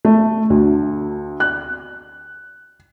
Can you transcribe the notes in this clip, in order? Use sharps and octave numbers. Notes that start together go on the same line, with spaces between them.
A3
D2
F#6